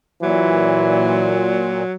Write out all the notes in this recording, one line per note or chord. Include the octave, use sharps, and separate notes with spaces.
A#2 E3 F#3